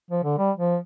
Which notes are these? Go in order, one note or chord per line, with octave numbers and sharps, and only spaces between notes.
F3
D3
G3
F3